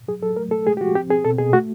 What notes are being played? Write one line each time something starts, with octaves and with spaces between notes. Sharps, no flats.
F#3 G#4
F#3 A4
A3 A#4
A3 A4
G#3 G#4
G4
F3 F#4
C4 G4
C4 G#4
B2 A4
B2 G#4
A3 F#4